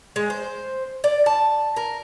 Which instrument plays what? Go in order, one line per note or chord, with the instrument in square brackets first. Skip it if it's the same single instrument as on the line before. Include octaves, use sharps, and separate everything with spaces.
[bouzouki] G#3
C5
D5
A5
A#4